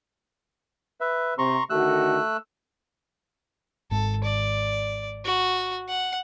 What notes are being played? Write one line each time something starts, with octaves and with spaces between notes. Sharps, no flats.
B4 E5
C3 A#5 C6 C#6
D3 D#3 A3 F#4 E6 F#6
G#1 G#2 A4
D5
F#4
F#5